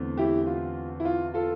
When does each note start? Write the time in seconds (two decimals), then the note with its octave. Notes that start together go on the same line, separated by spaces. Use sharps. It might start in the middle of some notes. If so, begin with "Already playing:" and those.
Already playing: E2 D3 A3 C4
0.17 E4 G4
0.46 F4
1.00 E4
1.05 F4
1.34 F4 A4